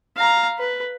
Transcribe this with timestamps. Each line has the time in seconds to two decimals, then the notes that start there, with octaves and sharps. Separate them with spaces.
0.17 F5 A#5
0.59 B4